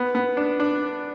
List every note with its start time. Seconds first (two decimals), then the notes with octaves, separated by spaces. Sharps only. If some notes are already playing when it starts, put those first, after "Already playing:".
Already playing: B3
0.15 B3
0.37 D4
0.60 D4